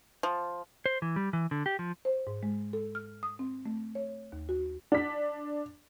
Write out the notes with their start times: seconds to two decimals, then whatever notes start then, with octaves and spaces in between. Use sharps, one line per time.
0.23 F3
0.86 C5
1.02 E3
1.16 G3
1.33 E3
1.51 D3
1.66 G4
1.79 F3
2.05 C5
2.27 G#2
2.43 G#3
2.73 A4
2.95 F6
3.23 D#6
3.39 C4
3.66 A3
3.95 C#5
4.32 D#2
4.49 F#4
4.92 D4 B6